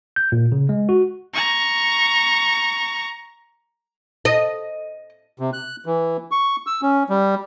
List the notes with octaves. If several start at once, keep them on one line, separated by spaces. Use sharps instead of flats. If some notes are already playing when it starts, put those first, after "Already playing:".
G6
A#2
C#3
G#3
F#4
A#5 C#6
D#5
C3
F#6
E3
C#6
E6
C#4
G3